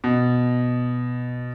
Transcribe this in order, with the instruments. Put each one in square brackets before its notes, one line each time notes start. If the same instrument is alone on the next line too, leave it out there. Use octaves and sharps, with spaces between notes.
[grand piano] B2